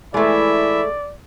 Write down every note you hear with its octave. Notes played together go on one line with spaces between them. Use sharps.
E3 G#3 A3 E4 D5 E5